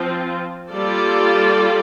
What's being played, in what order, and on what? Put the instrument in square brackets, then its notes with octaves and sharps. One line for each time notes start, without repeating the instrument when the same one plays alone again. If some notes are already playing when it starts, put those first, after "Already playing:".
Already playing: [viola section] F3 C4 F4
G3 A#3 F4 A4 D5